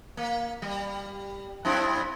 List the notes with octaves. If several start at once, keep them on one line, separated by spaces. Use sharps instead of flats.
A#3
G3
F#2 C4 E4